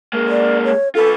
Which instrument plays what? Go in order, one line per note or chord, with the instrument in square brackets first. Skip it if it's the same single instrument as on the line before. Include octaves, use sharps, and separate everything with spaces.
[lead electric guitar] G#3 A#3
[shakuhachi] D5
C#5
[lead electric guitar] F4 B4 [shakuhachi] A4